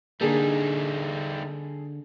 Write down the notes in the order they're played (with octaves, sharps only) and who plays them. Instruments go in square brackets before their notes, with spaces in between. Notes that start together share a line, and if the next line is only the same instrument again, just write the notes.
[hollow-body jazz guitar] D3 A#3 [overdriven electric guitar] G3 D#4 [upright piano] G#4 A4